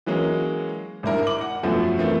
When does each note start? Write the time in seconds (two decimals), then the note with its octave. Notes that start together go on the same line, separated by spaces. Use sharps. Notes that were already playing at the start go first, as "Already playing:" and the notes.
0.06 E3 F#3 G#3 A#3 C#4
1.03 G#1 G2 E4 A#4
1.27 D6 F#7
1.41 F#5
1.63 F#2 B2 F3 A3
1.99 E3 A3 A#3 C4